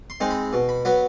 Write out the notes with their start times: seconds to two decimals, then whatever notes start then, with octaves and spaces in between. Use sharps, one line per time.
0.10 C6
0.20 G#3 C4 D#4
0.31 B5
0.53 B2
0.69 B5
0.85 F#3 B3 B5